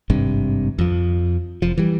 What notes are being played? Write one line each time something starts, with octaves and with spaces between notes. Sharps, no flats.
G#1 G2 C3
F2 F3
F1 F3
E3 G3